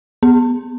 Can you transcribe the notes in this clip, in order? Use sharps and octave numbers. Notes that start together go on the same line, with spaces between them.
B3